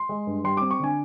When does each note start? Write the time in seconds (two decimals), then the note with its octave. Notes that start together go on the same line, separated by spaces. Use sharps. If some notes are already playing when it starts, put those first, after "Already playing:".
Already playing: C6
0.09 G#3
0.27 G2
0.44 G3 C6
0.57 C4 D6
0.71 C#6
0.80 D3 G#5